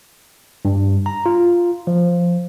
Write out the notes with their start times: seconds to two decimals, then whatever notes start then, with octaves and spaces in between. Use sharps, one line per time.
0.65 G2
1.06 A#5
1.26 F4
1.87 F3